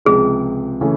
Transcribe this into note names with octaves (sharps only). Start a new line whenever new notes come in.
C#2 C3 F3 G#3 G#4
C#3 E3 A3 C#4